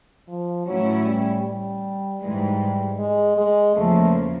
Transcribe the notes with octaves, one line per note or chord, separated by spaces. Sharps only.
F3
A2 E3 F#3 A3 C#4 E4
G3
G3
G#2 E3 G3 G#3
G#3
G#3
E2 C#3 F3 A3 A#3